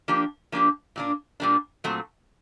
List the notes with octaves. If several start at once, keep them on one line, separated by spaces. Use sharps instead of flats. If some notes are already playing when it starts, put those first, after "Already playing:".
F3 A#3 D4 G4
F3 A#3 D4 G4
A#2 G3 A#3 D4
A#2 G3 A#3 D4
A#2 F#3 A3 C4